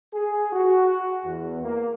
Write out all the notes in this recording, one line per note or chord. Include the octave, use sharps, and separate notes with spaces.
G#4
F#4
E2
A#3